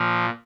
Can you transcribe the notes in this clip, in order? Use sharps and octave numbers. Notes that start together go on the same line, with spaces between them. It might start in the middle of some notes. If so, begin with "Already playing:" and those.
Already playing: A#2 F3